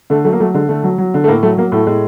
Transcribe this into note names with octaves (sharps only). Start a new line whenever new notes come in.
D3 A3
F#3 A3
A#3
F#3 A3
D3 G#3
D3 A3
F#3
F#3
D3
A3
A2 A#3
F#3 A3
F#3 A#3
A2 A3
A2 G#3